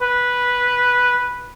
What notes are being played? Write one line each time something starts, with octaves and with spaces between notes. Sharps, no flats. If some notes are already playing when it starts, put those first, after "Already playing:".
B4